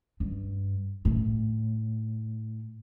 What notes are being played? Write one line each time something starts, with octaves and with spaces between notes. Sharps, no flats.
G2
A2